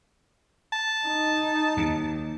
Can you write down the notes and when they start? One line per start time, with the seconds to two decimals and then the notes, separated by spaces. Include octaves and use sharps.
0.72 A5
1.06 D#4
1.77 D#2